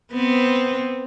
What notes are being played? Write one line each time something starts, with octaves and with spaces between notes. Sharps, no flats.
B3 C4